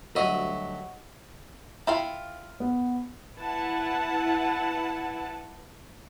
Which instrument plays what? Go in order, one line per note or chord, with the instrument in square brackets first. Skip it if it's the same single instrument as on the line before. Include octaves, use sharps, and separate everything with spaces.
[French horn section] D2 G3 [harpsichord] F#3 E4 [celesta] C#5 F#5 C#6 [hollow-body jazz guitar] D#5
[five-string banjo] E4 F4 F5 [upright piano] G5
[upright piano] B3
[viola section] E4 B4 F#5 A5